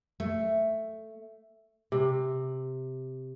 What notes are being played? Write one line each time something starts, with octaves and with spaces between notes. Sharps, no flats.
A3
C3